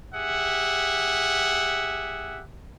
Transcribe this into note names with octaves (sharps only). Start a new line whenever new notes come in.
G4 G#4 E5 F#5